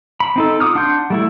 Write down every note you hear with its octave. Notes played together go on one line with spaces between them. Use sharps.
B5
C4 D#4 A4
F4 F#4 D6 D#6 F6
D4 F#5 C6 G6
G3 A3 E4